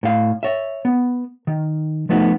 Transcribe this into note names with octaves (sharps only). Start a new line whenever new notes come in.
A2 F5
C#5 E5
B3
D#3
F3 A3 B3 D#4 F#4